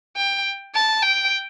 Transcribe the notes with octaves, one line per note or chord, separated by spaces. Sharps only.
G5
A5
G5